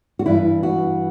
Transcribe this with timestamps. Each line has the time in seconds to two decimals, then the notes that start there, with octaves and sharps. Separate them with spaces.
0.19 F#4
0.26 G2 E3 E4
0.63 F#4